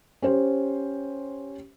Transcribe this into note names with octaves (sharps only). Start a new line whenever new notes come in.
C#4 G4 C5